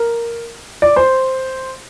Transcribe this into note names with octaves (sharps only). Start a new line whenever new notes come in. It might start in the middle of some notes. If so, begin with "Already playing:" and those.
Already playing: A#4
D5
C5